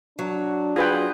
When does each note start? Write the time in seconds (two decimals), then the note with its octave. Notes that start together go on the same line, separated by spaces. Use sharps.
0.19 F#3 D4
0.76 F4 G#4 B4 G5